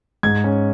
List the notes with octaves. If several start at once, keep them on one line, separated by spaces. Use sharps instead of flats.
G#2 G#6
C#4